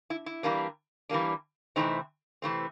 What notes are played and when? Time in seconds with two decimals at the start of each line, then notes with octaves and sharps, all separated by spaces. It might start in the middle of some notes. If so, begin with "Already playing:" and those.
0.10 E4
0.26 E4
0.43 E3 G3 A#3 D4
1.09 E3 G3 A#3 D4
1.76 C3 E3 A3 C4 D#4
2.42 C3 E3 A3 C4